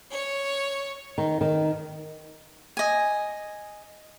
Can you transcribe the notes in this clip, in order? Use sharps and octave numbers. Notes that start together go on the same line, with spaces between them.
C#5
D#3
D#3
D#5 G#5